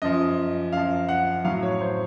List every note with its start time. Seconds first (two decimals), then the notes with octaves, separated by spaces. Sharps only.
0.02 F#2 F3 D#5
0.72 F#2 F3 F5
1.09 F#5
1.45 A2 F#3 F5
1.63 C#5
1.81 C5